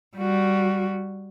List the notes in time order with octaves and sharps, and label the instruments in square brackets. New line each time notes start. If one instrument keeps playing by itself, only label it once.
[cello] G3 F#4